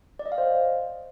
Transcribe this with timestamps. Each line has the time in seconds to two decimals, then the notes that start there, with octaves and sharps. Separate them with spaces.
0.19 D5
0.26 D#5
0.32 F5
0.38 C5